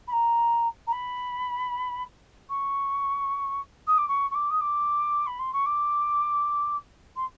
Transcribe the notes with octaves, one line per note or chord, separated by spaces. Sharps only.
B5
A#5
A#5
B5
C#6
D#6
D6
C#6
C#6
D6
D#6
D6
B5
C6
C#6
D6
C6